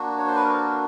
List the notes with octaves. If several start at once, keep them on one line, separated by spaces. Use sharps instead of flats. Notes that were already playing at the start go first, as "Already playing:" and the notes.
Already playing: A#3 D4 F#4
C#5
C5
B4
A#4
A4